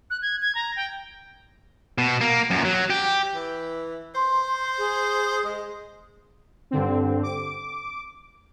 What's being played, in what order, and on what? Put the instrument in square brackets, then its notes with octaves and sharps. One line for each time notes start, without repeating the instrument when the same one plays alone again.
[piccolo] F#6
G#6
G#6
A#5
G5
[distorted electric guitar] B2
A#3
F#2 A#2
F#3
G4
[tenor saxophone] E3
[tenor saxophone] C5 [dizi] C6
[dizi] G#4
[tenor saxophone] G#3
[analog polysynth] G2 D3 C4
D6